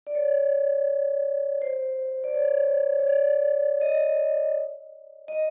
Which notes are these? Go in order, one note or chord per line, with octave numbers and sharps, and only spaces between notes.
D5
C#5
C5
D5
C#5
C#5
D5
D#5
D#5